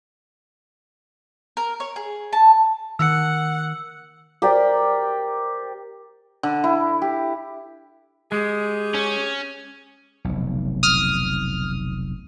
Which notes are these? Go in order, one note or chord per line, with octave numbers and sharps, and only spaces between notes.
A#4
C#5
G#4
A5
D#3 F#5 E6 C#7
G4 A#4 C5 D5
D3
E4
G4
G#3 G4 G#4
C#4
F1 B1
D#6 F6